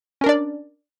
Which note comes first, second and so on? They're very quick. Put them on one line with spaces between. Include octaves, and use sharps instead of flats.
C#4 A#4 D4 D5